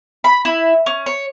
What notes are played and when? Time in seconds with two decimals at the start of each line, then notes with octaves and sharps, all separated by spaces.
0.24 B5
0.45 E4
0.86 C#4
1.06 C#5